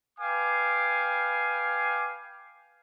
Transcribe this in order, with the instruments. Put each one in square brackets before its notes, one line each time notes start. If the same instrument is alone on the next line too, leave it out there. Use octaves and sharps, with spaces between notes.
[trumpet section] B4 F5 G5 G#5 D6